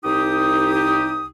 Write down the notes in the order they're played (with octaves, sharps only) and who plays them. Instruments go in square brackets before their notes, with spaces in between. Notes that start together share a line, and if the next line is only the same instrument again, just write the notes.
[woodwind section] C2 D#4 G4 D#6